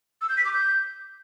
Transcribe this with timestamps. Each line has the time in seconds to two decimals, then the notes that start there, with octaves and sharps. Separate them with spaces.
0.21 E6
0.29 G6
0.37 B6
0.45 D6
0.53 G6